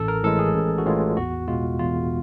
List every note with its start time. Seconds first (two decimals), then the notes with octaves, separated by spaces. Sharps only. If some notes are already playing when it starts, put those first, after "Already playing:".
Already playing: A1 A4
0.08 A#4
0.23 A2 E3 G#3 A4
0.39 G#4
0.55 A1
0.78 F#4
0.86 A2 E3 G#3 F4
1.17 E2 F#4
1.48 B2 G#3 F4
1.79 E2 F4